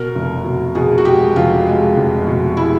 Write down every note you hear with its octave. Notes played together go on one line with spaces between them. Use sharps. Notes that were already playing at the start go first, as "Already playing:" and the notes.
Already playing: B2 A#4
F1
B2
B2 G#4
F#4
G#3 G4
F1 F4
G#3
F1
B2
G#3 E4